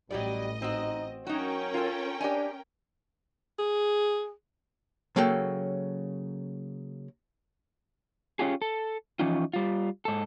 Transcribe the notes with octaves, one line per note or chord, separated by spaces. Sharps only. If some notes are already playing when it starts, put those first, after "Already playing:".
A1 F#3 G3 G4 D5 D#5
C4 D#4 F#4
F#3 C#4 D#4 F#4 A#4 G5
F4 A4
D4 G4 D#5 G#5
G#4
C#3 F#3 A#3 A4 G5
C#4 F4 G4 G#4
A4
E3 F3 C#4 D#4 F4
G3 F4
G#2 A4